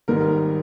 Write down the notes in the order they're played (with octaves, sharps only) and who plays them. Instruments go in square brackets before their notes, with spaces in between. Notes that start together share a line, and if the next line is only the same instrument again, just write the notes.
[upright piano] G#1 G#2 G3 A#4